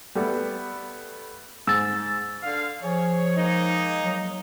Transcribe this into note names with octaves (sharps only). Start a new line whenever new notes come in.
G3 A3 B3
G#2 E6 A6
D3 F5
F3 G#4 C#5
G#3 A#3 D#4
F#3